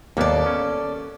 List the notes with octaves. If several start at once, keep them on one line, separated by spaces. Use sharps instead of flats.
D#2 A#3 B3 A4 D5
C#4